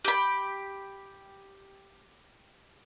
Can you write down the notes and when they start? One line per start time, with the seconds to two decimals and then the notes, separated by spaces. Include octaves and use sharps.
0.05 G4 B5